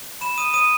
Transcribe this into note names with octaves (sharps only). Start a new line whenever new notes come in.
B5 E7
D#6 D#7
D#6 D#7